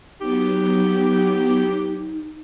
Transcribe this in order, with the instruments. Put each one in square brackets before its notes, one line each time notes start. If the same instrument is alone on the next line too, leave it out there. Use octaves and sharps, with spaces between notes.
[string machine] F#3 B3 [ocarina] D#4 [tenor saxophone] G4